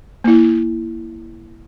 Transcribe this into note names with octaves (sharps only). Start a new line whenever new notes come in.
A#3 E4